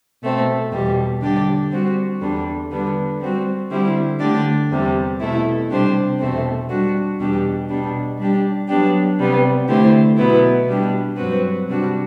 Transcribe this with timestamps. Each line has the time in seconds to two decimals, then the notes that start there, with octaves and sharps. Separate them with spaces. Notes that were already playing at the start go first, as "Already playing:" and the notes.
0.22 B2 A3 C4
0.71 E2 B2 G3
1.21 D3 G3 D4 G4 D5
1.71 G3 C4 F#4
2.21 E2 D3 G3 D4
2.71 D3 G3 B3 D4
3.20 G3 C4 F#4
3.70 D3 G3 C4 E4
4.20 D3 A3 D4 G4 D5
4.71 E2 C3 G3
5.20 B2 A3 E4
5.69 C3 G3 D4 G4 C5
6.19 E2 B2 A3 C4
6.69 G3 D4 F#4
7.19 E2 B2 G3 D4 G4
7.69 B2 G3 D4
8.18 G3 D4 G4
8.68 F#3 B3 D4 G4
9.18 C3 G3 B3
9.68 D3 A3 E4 G4 C5
10.17 B2 F#3 B3 E4
10.67 B2 G3 D4 G4
11.17 G2 F#3 C4 F#4 B4
11.67 C3 G3 D4 F#4